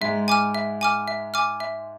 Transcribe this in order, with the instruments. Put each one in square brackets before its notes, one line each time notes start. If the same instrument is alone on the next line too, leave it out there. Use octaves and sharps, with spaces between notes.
[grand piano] G#2 G#3 [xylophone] E5
[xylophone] G#5 D6 F6
E5
G#5 D6 F6
E5
G#5 D6 F6
E5